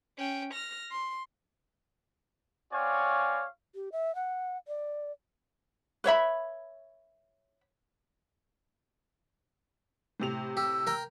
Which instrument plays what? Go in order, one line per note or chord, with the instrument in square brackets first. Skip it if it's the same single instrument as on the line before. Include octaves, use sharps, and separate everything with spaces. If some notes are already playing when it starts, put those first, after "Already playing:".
[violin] C#4 G5
F6 A#6
C6
[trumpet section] C4 F#4 C#5 D5 F5 G#5
[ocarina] G4
E5
F#5
D5
[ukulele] B4 C#5 E5 B5
[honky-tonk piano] A2 C3 F7
[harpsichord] G4 [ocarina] E6
[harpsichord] A#4 G5